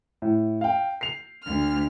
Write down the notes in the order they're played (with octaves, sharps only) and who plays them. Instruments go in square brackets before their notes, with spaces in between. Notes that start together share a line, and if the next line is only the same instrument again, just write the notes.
[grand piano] A2
F5 G5
C7 F7
[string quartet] D2 F6